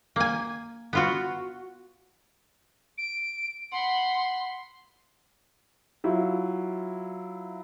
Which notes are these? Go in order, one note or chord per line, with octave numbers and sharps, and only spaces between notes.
A#3 G#5
B3 F4 F#4
D7
F#5 B5 C6
F#3 E4 F4